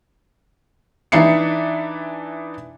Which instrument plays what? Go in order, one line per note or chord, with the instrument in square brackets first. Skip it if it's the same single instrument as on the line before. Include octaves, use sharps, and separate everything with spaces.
[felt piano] E3 D4 D#4 E5 C7 C#7